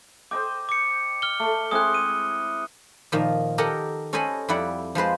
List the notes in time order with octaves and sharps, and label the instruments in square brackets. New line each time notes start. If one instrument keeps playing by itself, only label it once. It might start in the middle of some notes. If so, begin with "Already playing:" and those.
[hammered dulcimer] C5 D#5 G5 [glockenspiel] D6
[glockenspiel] D6 C#7
F6 G7
[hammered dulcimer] A3
[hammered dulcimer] G#3 C4 E4 [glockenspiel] D#6 F#6
[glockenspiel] D#7
[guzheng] A#2 D#3 F3
G4 A4 A#4 D#5 F#5
C#4 A4 C5 D#5 G#5 B5
F2 G3 E4 D5 F#5
F3 G#3 B4 C5